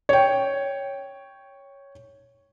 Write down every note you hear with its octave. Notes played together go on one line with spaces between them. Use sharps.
C#5 G5